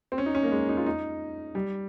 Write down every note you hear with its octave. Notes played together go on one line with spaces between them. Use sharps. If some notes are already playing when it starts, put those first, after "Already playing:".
C4
C#4
D#4
C#4
A#3
G#3
D#4
F4
D#4
G3